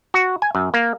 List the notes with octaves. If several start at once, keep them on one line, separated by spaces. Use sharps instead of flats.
F#4
G#5
F#2
A#3